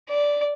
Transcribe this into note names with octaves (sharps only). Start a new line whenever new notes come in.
D5